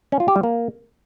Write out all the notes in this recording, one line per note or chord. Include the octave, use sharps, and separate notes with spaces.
C#4
F4
G4
G3
A#3